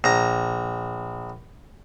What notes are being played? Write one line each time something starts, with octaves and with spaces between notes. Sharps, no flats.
A#1 A#5